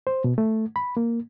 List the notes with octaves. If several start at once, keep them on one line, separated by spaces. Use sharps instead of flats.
C5
B2
A3
B5
A#3